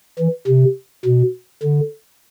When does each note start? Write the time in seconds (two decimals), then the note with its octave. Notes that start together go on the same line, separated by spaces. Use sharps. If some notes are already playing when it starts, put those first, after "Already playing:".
0.19 E3
0.47 C3
1.05 B2
1.63 D3